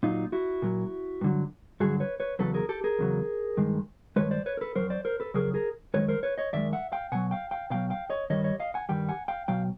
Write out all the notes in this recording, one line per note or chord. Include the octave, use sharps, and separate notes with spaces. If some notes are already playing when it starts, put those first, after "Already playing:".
A#2 F#3 D#4 F4
E4 F#4
A#2 F#3
G2 D3 F#3
G2 D3 F#3 F#4 G#4
B4 C#5
B4 C#5
E2 C#3 F#3 A4 B4
G#4 A#4
G4 A4
G#4 A#4
E2 C#3 F#3
G2 D#3 G#3
G2 D#3 G#3 B4 C#5
C5 D5
B4 C#5
A#4
A4 B4
F2 C#3 F#3 A#4 C5
C5 D5
A#4 C5
A4 B4
F2 C#3 F#3 G#4 A#4
G#4 A#4
F#2 D#3 G#3 B4 C#5
A#4 C5
B4 C#5
C#5 D#5
F#2 D#3 G#3 D5 E5
E5 F#5
F5 G5
B2 F#3 F#5 G#5
F5 G5
F5 G5
B2 F#3 F5 G5
F5 G5
C#5 D#5
G2 D#3 G3 C#5 D#5
C#5 D#5
D#5 F5
F#5 G#5
G2 D#3 G3 G5
F#5 G#5
F5 G5
B2 F#3 F5 G5